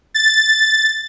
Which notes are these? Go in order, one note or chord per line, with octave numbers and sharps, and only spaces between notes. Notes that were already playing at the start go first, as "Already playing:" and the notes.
A6